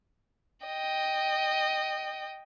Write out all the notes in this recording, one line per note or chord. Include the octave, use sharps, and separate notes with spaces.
D#5 G5